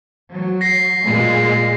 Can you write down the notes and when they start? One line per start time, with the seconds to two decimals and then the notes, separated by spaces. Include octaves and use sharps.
0.29 F#3
0.61 A#6 C7
1.04 A#2 G#3